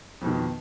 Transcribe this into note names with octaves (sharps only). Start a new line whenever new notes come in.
F2 B2 D#3